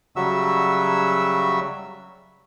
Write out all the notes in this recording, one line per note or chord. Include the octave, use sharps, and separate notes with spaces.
C#3 F#3 G3 F#4 E5 E6